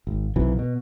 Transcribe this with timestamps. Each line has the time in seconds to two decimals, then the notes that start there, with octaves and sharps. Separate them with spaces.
0.07 G#1
0.36 B1 C3 E3 F#3
0.59 B2